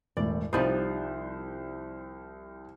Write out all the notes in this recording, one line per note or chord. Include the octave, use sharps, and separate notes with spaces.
E1 A2 D5
C2 F3 G3 D#4 C5